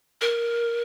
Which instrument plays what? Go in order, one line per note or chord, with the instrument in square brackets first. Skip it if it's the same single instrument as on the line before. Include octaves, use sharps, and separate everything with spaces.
[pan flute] A#4